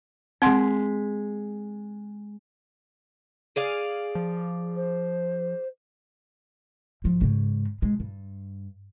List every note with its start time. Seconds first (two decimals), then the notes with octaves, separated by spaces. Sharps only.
0.42 G#3 C4 F#5 C6 B6
3.56 G#4 D5 F5
4.15 F3
4.76 C5
7.04 G#1 F3
7.21 G#2 C#3
7.82 B2 G#3
8.00 G2